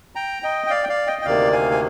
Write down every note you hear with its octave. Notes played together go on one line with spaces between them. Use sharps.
G5 A#5
D#5 G5
G5
D5 F5
G5
D5 F5
D#5 G5
G5
D2 C3 D#3 A#3 D5 F5
F5 G#5
G#5